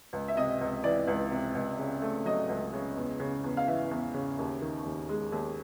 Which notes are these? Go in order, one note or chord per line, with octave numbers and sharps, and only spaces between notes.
C#2
E5
C3 D#5
C#2
E3 D5
C#2
C3
C#2
C#3
A3
F#3 D#5
C#2
C#3
E2
C#3
E2
F5
E3 E5
E2
C#3
D#2
D#3
D#2
G#3
D#2